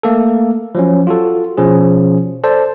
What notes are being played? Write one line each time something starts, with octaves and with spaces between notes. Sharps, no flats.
A3 A#3 A4
F3 F#3 C#4
F4 F#4 A4
B2 F3 C#4 G#4
A4 C5 D5 A5